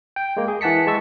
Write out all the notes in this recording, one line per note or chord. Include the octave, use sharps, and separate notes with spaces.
G5
G#3 A#3
G#4
E3 F#5 A5 B6 C#7
G#3 A5 C#6 E6